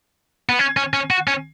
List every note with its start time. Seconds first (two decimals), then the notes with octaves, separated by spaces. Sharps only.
0.49 B3
0.59 C#4
0.77 C#4
0.93 C#4
1.10 F#4
1.27 C#4